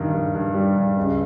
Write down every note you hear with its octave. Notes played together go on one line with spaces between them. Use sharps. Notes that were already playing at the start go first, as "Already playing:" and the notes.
Already playing: G2 D#3
G2
G2
G3
G2
C#2